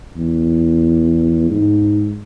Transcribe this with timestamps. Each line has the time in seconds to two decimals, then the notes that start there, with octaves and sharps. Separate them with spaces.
0.16 E2
1.50 G#2